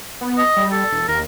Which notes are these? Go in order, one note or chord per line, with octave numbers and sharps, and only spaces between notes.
B3
D#5
G3
A4
E1
D#2 A#4